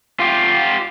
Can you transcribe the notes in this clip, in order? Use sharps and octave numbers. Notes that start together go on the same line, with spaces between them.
F4 G4